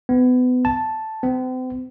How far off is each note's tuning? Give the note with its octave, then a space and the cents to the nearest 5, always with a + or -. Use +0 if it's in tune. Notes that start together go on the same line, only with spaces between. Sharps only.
B3 +30
A5 +0
C4 -40